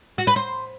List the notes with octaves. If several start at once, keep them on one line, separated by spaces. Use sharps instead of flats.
F#4
B4
C5